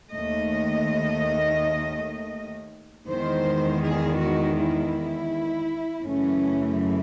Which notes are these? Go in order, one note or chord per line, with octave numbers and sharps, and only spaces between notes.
D#2 D#3 A3 D#5
E2 D#3 G#3 C5
G#4
F#4
E4
F#2 C#3 E3 A3 C#4